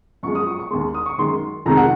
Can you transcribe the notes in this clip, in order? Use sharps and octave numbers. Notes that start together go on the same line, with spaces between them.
F#2 F3 G#3 C#6
D#6
C#6
C#6
D#2 D#3 G#3 C6
D#6
C#6
F#2 D#3 G#3 C6
F2 C3 D#3 G#3 A#5
F#5